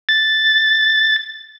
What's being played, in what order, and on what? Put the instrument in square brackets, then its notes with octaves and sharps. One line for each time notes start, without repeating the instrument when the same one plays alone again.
[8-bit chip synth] A6